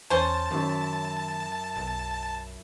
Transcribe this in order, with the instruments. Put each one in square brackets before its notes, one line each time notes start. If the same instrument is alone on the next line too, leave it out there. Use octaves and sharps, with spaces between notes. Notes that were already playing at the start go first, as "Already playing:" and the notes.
[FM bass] E2 [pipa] C#4 C5 [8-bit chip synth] A5
[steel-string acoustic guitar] F#2 E4 E5 [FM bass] D#3
[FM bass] B1